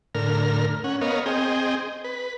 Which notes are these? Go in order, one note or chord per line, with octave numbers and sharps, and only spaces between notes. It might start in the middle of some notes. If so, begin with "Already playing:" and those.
A2 D3 A#4 F6
C#4 F#5
B3 A#4 C#5 D#5 F5
C4 G#4 D#5 G5
B4